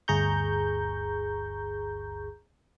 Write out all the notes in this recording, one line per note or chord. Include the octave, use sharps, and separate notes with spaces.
G1 D2 G#4 A#5 C#6 G6